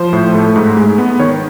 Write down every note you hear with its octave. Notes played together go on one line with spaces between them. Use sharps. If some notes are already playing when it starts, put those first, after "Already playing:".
Already playing: F3 C5
A2
A3
G#2
G#3
B3
D#3 C#5